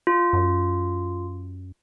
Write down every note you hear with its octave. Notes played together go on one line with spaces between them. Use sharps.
F4
F#2